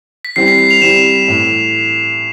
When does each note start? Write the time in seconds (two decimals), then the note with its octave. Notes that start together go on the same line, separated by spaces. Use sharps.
0.25 B6
0.36 E3 G3 C4 C7
0.48 B6
0.59 C7
0.71 F7
0.82 E3 G3 C4 E7
1.28 A2 E3